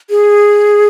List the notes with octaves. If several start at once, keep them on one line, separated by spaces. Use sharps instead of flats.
G#4